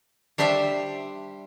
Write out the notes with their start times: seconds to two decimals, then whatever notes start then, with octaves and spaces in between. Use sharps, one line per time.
0.38 G3 D4 G4 C5 E5